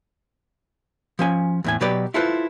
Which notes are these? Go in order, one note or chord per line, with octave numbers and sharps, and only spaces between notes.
F3 C#4 G#5
E2 A2 G#5
B2 F#3 G4 B4 D5
E4 F4 A4 B4 C5